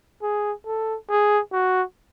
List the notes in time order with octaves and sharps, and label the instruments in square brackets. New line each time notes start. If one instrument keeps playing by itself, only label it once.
[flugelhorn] G#4
A4
G#4
F#4